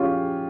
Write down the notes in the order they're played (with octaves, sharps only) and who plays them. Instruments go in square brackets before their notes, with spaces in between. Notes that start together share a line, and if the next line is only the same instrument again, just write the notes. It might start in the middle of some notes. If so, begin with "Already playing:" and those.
Already playing: [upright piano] F3 C#4 F4 G4 G#4